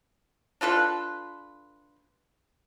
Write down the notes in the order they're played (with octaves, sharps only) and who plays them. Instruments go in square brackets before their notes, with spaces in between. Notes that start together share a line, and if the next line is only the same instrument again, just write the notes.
[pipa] D4 F4 A4 B4